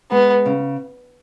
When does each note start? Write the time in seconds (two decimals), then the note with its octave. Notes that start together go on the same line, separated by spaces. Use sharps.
0.11 G#3 B3
0.46 C#3